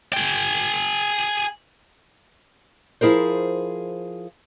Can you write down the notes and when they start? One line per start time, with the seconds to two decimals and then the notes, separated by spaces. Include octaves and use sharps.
0.13 G#4 G5
3.01 F3 E4 G#4 A#4 C5